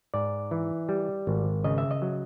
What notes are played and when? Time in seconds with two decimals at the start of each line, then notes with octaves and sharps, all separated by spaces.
0.14 G#2 D5
0.51 E3
0.89 G3
1.27 G#1
1.64 C#3 D#5
1.78 E5
1.91 D#5
2.02 F#3